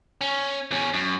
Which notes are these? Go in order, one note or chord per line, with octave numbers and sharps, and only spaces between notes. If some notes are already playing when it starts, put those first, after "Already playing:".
C#4
E2 C#4
F#2